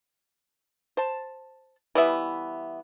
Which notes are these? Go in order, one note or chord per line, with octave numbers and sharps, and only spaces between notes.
C5 A5
E3 G3 B3 E5